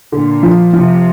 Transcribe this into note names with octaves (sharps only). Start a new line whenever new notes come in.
A#2 D3
F3
C3 F3